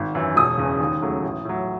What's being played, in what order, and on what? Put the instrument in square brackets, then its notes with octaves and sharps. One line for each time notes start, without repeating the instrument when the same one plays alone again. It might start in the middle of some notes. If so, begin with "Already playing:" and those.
Already playing: [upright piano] G#1
F#2 E3
E1 D#6
E2 C#3
D#2
C#3 F#3 A3
A1
A2 F#3